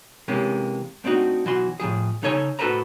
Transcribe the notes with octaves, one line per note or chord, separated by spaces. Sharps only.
C3 E3 G#3 A#3 C#4
A3 C4 D4 D#4 F#4
B1 E3 F#4 C6
A2 C3 F3 G#4
C#3 D#4 A4 C#5 G#5
A2 F#4 A4 B4 C5 A#5